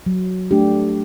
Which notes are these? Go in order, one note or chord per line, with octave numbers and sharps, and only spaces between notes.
F#3
A3 D4 G4